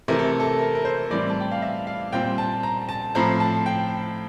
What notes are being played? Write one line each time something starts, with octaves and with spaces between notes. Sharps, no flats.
C3 E3 A3 A#4
A4
A4
A#4
A#4
C5
A2 E3 G3 C4 D5
A5
G5
F5
E5
F5
A#2 G3 C4 G5
A5
A#5
A5
A2 F3 C4 A#5
A5
G5